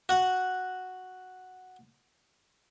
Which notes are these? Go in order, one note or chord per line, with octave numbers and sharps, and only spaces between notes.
F#4 F#5